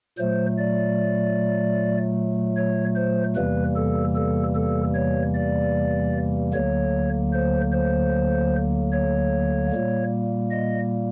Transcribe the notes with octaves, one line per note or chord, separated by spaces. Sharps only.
A#2 F#3 A3 C5
D5
C#5
C5
E2 C3 E3 G3 A#3 B4
A4
A4
A4
C#5
D5
D2 D3 F#3 A#3 C#5
C5
C5
C#5
A#2 G3 A#3
D#5